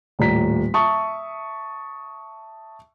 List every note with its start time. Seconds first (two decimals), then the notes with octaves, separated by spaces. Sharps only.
0.19 D#1 A2 D5 A#5 B6
0.74 E5 A5 C#6 D#6